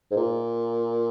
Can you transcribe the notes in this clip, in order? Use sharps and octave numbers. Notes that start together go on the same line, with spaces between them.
G#2
A#2